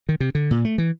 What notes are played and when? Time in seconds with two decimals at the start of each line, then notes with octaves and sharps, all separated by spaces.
0.09 D#3
0.20 C3
0.35 D3
0.51 A#2
0.65 A3
0.78 E3